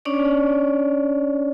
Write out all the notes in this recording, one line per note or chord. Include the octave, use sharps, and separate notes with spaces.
C#4 D4 C#5 D5